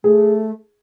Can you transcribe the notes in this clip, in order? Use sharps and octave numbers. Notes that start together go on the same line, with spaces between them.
A3 G#4